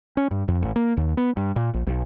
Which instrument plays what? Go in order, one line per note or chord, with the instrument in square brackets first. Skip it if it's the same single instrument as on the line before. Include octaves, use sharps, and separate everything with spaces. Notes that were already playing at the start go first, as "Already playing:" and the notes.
[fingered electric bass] C#4
G2
F2
A1
A#3
D#2
B3
G2
A#2
A#1
B1